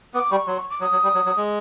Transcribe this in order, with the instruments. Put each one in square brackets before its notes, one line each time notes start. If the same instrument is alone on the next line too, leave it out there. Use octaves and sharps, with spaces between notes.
[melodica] B3 [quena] D6
[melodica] G3 [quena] C#6
[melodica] F#3 [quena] C6
[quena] C#6
D6
[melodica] F#3 [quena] D#6
[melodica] F#3
G3
F#3
F#3
G#3